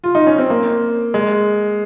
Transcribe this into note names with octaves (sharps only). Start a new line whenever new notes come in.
F4
D#4
C#4
C4
A#3
G#3